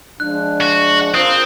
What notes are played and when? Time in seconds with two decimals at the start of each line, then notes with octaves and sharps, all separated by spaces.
0.20 F3 G#3 D4 F#6
0.61 F#4
1.15 C4 F4 A#4 C5 D#6